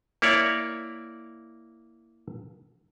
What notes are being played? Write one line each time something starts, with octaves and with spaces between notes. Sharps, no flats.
A#3 E4 C#5 D5